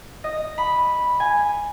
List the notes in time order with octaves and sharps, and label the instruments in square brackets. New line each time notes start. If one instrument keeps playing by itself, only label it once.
[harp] D#5
B5
G#5